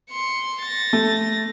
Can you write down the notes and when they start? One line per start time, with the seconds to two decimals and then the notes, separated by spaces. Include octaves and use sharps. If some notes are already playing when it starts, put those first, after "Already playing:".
0.10 C6 C#7
0.61 A6 A#6
0.93 A3